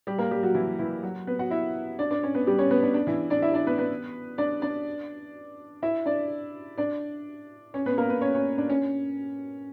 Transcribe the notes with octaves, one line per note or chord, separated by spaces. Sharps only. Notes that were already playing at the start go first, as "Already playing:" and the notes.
G3 G4
A#3 A#4
G3 G4
F#3 F#4
E3 E4
E3 E4
F#3 F#4
B3 B4
F#4 F#5
E4 E5
D4 D5
D4 D5
C#4 C#5
B3 B4
G3 G4
C#4 C#5
B3 B4
D4
D4
E3 E4
D4 D5
E4 E5
D4 D5
B3 B4
B3 B4
D4 D5
D4 D5
E4 E5
D4 D5
D4 D5
C#4 C#5
B3 B4
A#3 A#4
B3 B4
C#4 C#5
C#4 C#5
D4
C#4